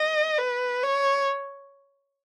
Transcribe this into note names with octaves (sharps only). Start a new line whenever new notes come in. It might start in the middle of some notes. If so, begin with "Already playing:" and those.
Already playing: D#5
B4
C#5